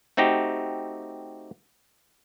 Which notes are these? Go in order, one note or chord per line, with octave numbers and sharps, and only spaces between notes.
A3 C4 D#4 F#4 G4